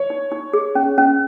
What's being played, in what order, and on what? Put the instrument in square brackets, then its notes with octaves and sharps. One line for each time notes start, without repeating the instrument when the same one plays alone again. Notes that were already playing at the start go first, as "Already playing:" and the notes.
Already playing: [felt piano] C#5
[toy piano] D#4
D#4
G#4
C#4
C#4